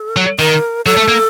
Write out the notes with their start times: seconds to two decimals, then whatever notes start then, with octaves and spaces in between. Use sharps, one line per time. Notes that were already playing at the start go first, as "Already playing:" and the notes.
Already playing: A4
0.16 F#3
0.39 D#3 A#4
0.86 F#3 A4
0.97 A3
1.08 A#3